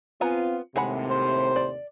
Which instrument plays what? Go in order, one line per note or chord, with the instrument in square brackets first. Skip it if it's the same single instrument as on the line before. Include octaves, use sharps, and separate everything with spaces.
[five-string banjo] B3 G#5 A#5 [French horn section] C4 F4
[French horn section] D#2 A2 C3 [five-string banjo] G#3 F#5 B5
[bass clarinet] C5
[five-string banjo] D5